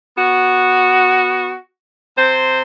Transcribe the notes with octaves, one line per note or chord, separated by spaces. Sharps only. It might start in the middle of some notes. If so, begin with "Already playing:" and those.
B3 F#4
C3 C5